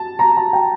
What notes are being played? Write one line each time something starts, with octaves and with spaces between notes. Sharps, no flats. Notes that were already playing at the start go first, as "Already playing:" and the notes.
Already playing: A5
A#5
A5
G5